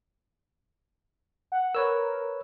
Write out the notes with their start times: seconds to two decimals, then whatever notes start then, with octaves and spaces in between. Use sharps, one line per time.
1.52 F#5
1.75 A#4 B4 C#5 E6